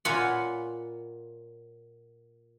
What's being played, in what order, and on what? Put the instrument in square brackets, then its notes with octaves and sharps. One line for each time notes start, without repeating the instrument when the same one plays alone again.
[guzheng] A#2 F4 C#5 F#5 G#5 B5